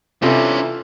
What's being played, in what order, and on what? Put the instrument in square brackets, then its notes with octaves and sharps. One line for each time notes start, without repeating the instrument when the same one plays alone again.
[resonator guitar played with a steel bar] C3 [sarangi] E3 [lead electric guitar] C#4 D4 [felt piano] F4 A4